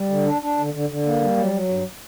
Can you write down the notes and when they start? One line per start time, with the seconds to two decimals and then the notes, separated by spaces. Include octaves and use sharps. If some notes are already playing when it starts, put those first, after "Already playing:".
Already playing: G3
0.09 D3
0.26 D4
0.42 D4
0.57 D3
0.74 D3
0.90 D3
1.05 A#3
1.21 G3
1.37 F#3
1.53 F#3
1.69 G2